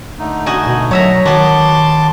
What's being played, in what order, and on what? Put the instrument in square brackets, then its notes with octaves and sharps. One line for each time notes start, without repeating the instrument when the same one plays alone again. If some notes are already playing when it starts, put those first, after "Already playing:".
[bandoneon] D3 A3 D#4
[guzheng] F#4 D#5 G#5
[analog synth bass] B2
[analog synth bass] F#3 [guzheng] C#5 E5 A#5
[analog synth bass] D#3 [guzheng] B3 F#4 [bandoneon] A5 C6 D6